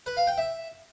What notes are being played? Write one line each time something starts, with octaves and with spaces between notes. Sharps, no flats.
B4
F5
G5
E5